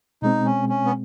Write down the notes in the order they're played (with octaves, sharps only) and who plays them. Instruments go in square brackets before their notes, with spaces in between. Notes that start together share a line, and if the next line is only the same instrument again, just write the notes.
[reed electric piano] B2 G#3 C4 [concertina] D#4
[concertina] C#4
C#4
B3